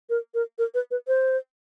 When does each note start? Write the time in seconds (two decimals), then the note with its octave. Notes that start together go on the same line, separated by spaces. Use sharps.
0.10 A#4
0.34 A#4
0.58 A#4
0.74 B4
0.91 B4
1.08 C5